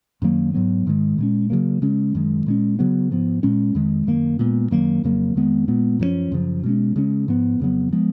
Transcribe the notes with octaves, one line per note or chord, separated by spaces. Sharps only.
F#2 D#3 F#3 A#3
G#2 F#3 B3
G#2 D#3 G#3
A#2 G#3 C#4
C#3 F#3 A#3
C#3 G#3 C#4
F#2 D#3 G#3
A#2 G#3 C#4
C#3 F#3 B3
G#2 F3 B3
A#2 G#3 C#4
F2 D#3 G#3
F#2 D#3 A#3
A#2 G#3 B3
F#2 D#3 F#3 A#3
F2 C#3 F#3 A#3
F2 D#3 G#3 B3
A#2 G#3 B3
F#2 F3 A#3 C#4
F#2 C#3 F3
B2 G#3 C#4
C#3 G#3 C#4
G#2 F3 B3
F2 C#3 F#3 B3
F3 G#3 B3